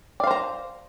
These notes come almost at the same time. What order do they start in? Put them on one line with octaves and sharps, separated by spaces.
D5 F5 C5 A#5